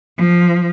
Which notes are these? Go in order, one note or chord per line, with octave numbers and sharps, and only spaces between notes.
F3